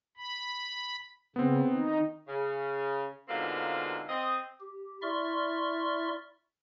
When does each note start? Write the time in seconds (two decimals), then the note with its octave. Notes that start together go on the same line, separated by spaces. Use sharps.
0.17 B5
1.36 C#3 B3 C4
1.71 D#3 D#4
2.28 C#3
3.29 G#2 B2 D3 A#3 C4 F4
4.09 C4 D#5
4.60 G4
5.02 E4 D5 E5 C6 C#6 F6